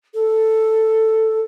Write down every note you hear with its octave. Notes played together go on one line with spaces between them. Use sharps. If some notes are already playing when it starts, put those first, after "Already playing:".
A4